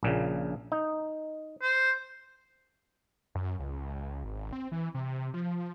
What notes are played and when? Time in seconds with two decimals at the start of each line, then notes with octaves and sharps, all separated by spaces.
0.03 A#1 A#2 C#3
0.72 D#4
1.62 C5
3.35 F#2
3.60 C#2
4.24 G#1
4.52 C4
4.72 E3
4.94 C3
5.34 F3